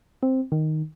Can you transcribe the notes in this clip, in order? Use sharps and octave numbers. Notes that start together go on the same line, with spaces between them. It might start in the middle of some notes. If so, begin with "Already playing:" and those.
C4
D#3